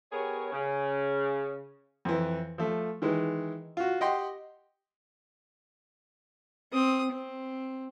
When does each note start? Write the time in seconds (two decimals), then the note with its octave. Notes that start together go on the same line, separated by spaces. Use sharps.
0.12 B3 G4 G#4 A#4 C#5
0.52 C#3
2.05 F2 E3
2.58 F3 A3
3.02 D#3 E3 G#3
3.77 F4 F#4
4.01 G4 D#5 F#5 G5 C6
6.72 C4 D#6
7.12 C4